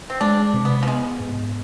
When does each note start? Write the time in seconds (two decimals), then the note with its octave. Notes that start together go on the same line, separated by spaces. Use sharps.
0.10 C4
0.21 G#3 D4
0.54 C3
0.65 B3
0.83 F3
0.87 G#3 B3
1.20 G#2